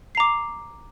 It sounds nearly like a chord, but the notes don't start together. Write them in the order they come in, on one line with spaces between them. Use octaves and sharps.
C7 A#5 D6